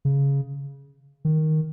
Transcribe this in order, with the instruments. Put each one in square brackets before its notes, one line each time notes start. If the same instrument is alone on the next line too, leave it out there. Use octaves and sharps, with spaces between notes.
[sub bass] C#3
D#3